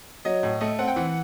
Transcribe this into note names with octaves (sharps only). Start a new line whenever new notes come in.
F#3 D#5
A2
A3 D#5
C4 F#5
G5
E3 F#5